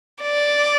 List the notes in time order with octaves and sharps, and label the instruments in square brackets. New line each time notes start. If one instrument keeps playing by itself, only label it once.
[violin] D5